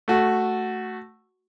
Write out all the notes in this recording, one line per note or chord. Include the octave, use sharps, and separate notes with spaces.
A3 F#4